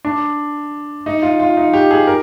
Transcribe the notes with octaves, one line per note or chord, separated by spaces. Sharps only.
D4
D#4
F4
F4
D#4
G4
G#4
A#4